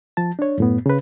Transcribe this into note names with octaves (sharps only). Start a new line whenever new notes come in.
F3 A5
D4 C#5
F#2 A2 B3
C#3 B4